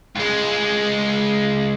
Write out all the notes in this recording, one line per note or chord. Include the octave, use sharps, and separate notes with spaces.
C#2 G#3